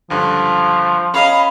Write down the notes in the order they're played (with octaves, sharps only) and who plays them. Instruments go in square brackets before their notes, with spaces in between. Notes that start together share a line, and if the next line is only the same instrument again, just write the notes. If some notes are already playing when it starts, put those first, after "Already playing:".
[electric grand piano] C#2 G2 D3 [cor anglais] F3
[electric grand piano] C#4 G#4 D#5 [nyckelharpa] F5 A#5 [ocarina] B5